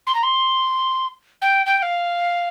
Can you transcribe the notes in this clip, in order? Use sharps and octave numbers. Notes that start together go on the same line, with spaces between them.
C6
A#5
C6
G5
G5
G5
F5